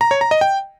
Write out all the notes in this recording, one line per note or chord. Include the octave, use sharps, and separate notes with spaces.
A#5
C#5
A#5
D#5
G5